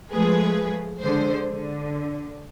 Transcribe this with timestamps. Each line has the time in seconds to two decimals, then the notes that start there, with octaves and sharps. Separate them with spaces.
0.11 F3 G#3 A3 G#4 B4
1.01 D3 G#3 C5
1.47 D3